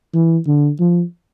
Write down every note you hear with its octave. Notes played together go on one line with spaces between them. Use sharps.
E3
D3
F3